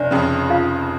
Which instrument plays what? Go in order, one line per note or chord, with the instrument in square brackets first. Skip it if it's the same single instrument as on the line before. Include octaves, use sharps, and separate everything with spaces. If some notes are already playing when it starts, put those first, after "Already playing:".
Already playing: [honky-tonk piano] F1 [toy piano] D4 D5
[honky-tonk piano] F2 C#3
[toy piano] F4 F5